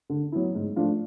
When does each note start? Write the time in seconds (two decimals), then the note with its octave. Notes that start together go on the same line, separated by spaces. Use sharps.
0.10 D3
0.32 F#3 B3 E4
0.55 G#2
0.76 F3 A3 D4 F4